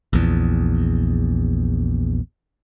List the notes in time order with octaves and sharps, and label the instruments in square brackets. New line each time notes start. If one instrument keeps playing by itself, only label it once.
[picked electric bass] A#1 E2